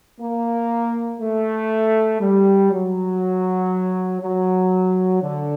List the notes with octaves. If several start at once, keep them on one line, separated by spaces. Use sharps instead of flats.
A#3
A3
G3
F#3
F#3
D3